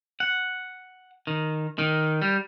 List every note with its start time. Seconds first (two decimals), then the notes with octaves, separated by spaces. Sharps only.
0.20 F#5
1.27 D#3
1.78 D#3
2.22 G3